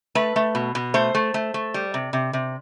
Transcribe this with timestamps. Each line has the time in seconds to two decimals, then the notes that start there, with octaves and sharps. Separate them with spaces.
0.15 A3 B4
0.36 A3
0.55 B2
0.75 B2
0.94 A3 C5
1.15 A3
1.34 A3
1.54 A3
1.74 G3
1.94 C3
2.13 C3
2.33 C3